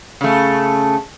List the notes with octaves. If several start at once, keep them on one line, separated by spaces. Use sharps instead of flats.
C#3 A3